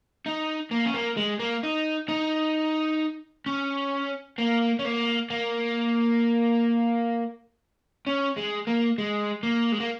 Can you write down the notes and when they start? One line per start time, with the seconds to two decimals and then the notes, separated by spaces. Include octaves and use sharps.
0.26 D#4
0.71 A#3
0.85 C#4
0.94 A#3
1.17 G#3
1.40 A#3
1.64 D#4
2.09 D#4
3.46 C#4
4.38 A#3
4.79 C#4
4.85 A#3
5.30 A#3
8.07 C#4
8.37 G#3
8.67 A#3
8.98 G#3
9.43 A#3
9.72 G#3
9.80 A#3